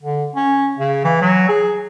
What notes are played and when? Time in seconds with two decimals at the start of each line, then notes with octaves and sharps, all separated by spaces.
0.03 D3
0.36 C#4
0.79 C#3
1.05 E3
1.21 F#3
1.49 G#4